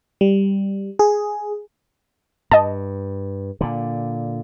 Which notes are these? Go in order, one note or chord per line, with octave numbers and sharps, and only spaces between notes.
G3
G#4
G2 D#5 A5
A#2 D3